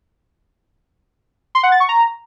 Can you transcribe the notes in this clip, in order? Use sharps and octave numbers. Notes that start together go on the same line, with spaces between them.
C6
F#5
A6
C#6
A#5